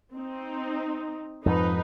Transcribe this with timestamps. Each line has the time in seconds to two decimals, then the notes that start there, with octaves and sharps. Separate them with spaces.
0.15 C4 D#4
1.46 F2 G#2 F3 D#4 B4